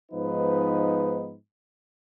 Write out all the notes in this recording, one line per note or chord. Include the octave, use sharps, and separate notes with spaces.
G#2 F3 B3 D#4 B4